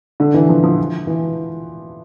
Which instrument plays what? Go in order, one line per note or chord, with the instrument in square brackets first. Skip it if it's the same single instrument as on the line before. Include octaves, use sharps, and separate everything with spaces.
[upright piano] D3
E3
F3
F3
E3